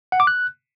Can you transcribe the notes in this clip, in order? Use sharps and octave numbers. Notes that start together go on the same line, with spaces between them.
F#5
D6
F#6